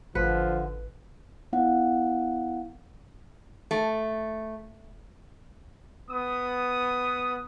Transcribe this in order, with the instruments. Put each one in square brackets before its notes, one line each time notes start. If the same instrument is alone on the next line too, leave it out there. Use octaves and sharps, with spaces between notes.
[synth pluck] G#1 A2 [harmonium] D3 [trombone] F3 [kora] B4
[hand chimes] B3 E4 F5 F#5
[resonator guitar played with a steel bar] A3
[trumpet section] B3 D#6